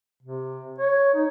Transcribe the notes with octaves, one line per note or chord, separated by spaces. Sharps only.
C3
C#5
D#4